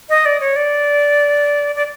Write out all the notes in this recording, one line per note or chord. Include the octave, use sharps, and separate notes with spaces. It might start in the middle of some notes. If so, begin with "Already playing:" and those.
D#5
D5
C#5
D5
D5